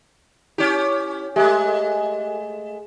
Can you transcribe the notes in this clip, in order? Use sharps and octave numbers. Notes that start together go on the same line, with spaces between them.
C#4 E4 G4
G#3 A3 G4 E5 G#5